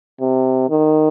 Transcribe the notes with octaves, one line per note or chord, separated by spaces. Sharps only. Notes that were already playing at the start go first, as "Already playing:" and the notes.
C3
D#3